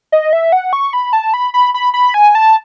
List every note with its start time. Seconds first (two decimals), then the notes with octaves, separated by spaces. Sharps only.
0.12 D#5
0.33 E5
0.52 F#5
0.73 C#6
0.93 B5
1.13 A5
1.34 B5
1.54 B5
1.74 B5
1.94 B5
2.14 G#5
2.35 A5